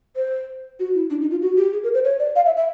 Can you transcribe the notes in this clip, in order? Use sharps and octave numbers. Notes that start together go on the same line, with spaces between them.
C5
F#4
E4
D4
D#4
F4
F#4
G4
G#4
A#4
C5
C#5
D5
F5
E5
E5